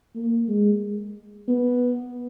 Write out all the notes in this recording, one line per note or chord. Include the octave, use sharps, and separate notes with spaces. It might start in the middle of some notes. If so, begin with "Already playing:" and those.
A#3
G#3
B3